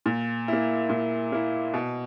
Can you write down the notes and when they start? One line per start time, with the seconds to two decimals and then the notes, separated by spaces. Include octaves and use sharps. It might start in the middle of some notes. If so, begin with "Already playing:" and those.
0.06 A#2
0.48 A#3 E4
0.90 A#2
1.32 A#3 E4
1.74 B2